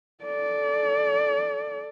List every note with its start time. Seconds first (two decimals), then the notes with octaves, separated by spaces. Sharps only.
0.24 A4 D5